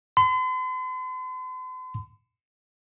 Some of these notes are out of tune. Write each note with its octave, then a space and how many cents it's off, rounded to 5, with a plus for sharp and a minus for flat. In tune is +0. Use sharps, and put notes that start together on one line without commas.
C6 -45